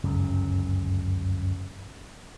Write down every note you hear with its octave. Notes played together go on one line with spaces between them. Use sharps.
G1 C#2 F#2 C#3